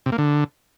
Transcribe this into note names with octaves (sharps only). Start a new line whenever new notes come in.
C3
A#3
D3